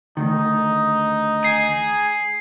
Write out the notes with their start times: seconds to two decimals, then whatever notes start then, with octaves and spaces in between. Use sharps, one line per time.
0.17 D2 D#3 D#4
1.44 G#4 C7